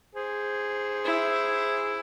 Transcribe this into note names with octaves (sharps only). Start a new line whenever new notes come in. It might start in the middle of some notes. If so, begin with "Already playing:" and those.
G#4 C5
E4